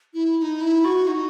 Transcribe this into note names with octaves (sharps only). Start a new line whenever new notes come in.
E4
E4
D#4
E4
F#4
D#4